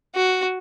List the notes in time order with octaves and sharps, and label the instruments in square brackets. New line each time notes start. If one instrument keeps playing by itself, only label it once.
[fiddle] F#4